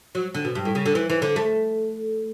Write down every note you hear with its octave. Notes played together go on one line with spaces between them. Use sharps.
F#3
D3
B2
G2
A2
C#3
D3
E3
E3
D3
A3